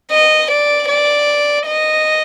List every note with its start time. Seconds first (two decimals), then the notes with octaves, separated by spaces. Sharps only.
0.11 D#5
0.51 D5
0.89 D5
1.66 D#5